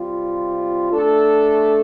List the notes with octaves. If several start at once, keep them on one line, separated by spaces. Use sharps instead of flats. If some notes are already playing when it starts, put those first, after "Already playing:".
Already playing: C3 G3 C4 F4
A3 D4 A4